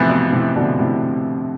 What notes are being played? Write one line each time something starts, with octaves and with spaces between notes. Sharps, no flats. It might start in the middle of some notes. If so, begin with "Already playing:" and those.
Already playing: F2 A2 C3 E3 B3 E4
B2
A2 C3
B2 D3
A2 C3